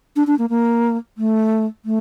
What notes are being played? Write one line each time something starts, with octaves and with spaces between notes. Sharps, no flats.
D4
D4
A#3
A#3
A3
A3